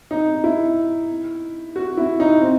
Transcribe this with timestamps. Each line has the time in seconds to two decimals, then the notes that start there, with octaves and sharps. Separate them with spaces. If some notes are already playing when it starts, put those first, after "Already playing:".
0.11 D#4
0.44 E4
1.76 F#4
1.97 E4
2.20 D#4
2.41 C4